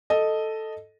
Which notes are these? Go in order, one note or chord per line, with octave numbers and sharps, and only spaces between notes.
A4 D#5